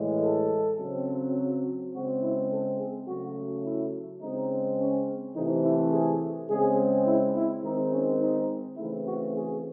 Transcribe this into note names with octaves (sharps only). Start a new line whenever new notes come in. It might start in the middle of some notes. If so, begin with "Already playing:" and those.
Already playing: A2 E3 G#3
A4
C#3 F#3 C4
C#3 G#3 C4 F#4
E4
A4
G#4
C#3 F#3 A3 F#4
E4
C#3 G#3 C4 D#4
C#4
C3 E3 A3 C4 D#4
E4
G#4
C#3 G#3 C4 G#4
E4
E4
D#3 G#3 C4 D#4
C#4
D#4
C#3 E3 A3 C4 E4
F#4
G#4